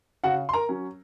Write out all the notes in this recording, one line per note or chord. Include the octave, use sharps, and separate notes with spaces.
C#3 F#4 F#5
C6
A#4 A#5
F#3 C#4